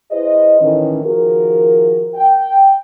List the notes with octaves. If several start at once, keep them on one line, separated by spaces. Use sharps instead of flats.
E4 G#4 B4 C5 D#5
A2 D#3 E3 C#4
D#3 F3 F#4 G#4 A#4
G5